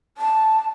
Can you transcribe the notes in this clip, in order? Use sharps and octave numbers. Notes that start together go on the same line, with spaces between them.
A5